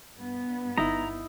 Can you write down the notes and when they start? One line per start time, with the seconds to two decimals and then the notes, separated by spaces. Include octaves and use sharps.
0.16 G2 B3
0.78 G1 D#4 E4 A#5